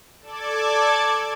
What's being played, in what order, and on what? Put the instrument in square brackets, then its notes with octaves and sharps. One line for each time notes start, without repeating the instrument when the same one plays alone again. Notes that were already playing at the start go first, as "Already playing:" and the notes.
[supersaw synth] A4 D5 A5 D6 G#6